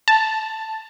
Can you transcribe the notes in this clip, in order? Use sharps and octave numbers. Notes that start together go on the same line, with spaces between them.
A5